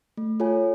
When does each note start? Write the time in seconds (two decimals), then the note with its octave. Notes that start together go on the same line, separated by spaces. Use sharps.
0.17 A3
0.40 F4 A4 C#5 G#5